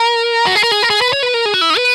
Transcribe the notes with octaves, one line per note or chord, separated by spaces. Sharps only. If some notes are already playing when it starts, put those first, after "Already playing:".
Already playing: A#4
F#4
G#4
A#4
G#4
A#4
G#4
B4
C#5
B4
A#4
G#4
F#4
E4
D#4
B4